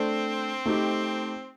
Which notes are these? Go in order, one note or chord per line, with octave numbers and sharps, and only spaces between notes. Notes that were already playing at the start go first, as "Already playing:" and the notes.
Already playing: A3 C4 D4 A4 C5
A3 D#4 G4